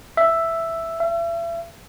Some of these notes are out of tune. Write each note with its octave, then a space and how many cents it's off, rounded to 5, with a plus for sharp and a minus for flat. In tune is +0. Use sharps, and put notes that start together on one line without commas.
E5 +5
E5 +40